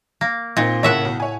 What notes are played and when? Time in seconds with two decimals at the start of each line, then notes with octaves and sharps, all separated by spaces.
0.21 A#3
0.57 A#2 A#3 C4 D#4
0.83 A2 C#3 A#3 C#5 E5 F#5
1.05 B1
1.20 C#5 G#5